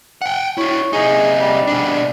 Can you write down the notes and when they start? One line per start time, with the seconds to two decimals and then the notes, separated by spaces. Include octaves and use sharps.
0.22 F#5 G5
0.58 E4 F#4 C#5
0.93 C3 D#4 G#4
1.40 G3
1.67 B2 D4